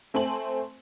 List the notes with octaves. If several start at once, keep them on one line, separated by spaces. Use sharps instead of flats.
A3 C4 G#5 A5 C6 F#7